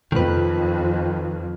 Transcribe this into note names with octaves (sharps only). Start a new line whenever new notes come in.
F2 D#3 B4